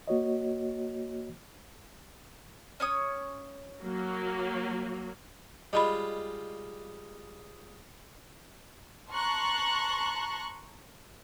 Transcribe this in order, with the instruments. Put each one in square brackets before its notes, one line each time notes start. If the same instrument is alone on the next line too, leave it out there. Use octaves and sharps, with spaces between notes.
[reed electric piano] A#3 F#4 C#5 D#5
[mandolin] C#4 C#5 D#6
[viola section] F#3 A#3
[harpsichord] G3 G#3 F4 [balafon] D#5 B5
[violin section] A5 A#5 C6 C#6 F#6